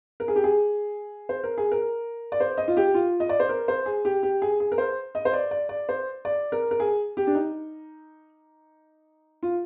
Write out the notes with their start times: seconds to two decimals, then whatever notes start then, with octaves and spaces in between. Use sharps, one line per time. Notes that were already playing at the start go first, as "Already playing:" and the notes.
0.20 A#4
0.28 G#4
0.36 G4
0.44 G#4
1.29 C5
1.44 A#4
1.58 G#4
1.72 A#4
2.32 D5
2.40 C5
2.57 D#5
2.68 F4
2.77 G4
2.94 F4
3.20 D#5
3.29 D5
3.40 C5
3.49 A#4
3.68 C5
3.86 G#4
4.05 G4
4.23 G4
4.42 G#4
4.60 G#4
4.72 A#4
4.78 C5
5.15 D#5
5.25 C5
5.33 D5
5.51 D5
5.69 D5
5.89 C5
6.25 D5
6.52 A#4
6.71 A#4
6.80 G#4
7.17 G4
7.27 D4
7.35 D#4
9.43 F4